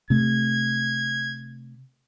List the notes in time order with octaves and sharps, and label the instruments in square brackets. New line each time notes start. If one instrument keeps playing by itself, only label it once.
[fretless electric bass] C3 A3 [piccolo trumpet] G#6